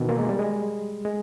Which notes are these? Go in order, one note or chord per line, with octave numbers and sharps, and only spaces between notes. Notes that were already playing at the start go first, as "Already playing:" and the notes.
Already playing: B2 D#3 E3
A#3
G#3
G3
G#3
G#3